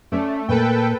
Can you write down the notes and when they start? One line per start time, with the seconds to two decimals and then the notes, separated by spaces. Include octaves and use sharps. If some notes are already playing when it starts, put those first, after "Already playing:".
0.12 A3 C#4 D5
0.48 A#2 A4 B4 G5